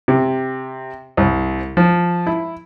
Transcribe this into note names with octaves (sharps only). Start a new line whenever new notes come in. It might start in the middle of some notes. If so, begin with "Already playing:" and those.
C3
C2
F3
E4